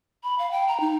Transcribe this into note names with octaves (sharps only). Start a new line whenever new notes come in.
B5
F5
G5
A#5
D#4